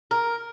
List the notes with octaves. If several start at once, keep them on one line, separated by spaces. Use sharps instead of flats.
A#4